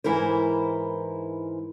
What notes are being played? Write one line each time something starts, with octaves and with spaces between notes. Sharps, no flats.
G#2 E3 E4 A#4 C5